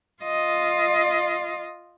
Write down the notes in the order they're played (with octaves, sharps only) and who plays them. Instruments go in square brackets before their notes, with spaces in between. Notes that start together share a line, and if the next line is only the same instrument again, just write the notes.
[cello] F4 D#5